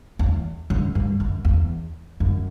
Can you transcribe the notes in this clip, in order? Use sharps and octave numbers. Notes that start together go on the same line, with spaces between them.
E2
F#2
G2
F#2
E2
F#2